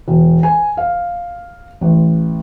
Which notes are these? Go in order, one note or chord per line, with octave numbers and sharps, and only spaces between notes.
E1
G#5
F5
A1